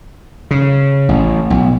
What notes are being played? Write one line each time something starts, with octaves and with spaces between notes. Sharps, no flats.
C#3
A1
B1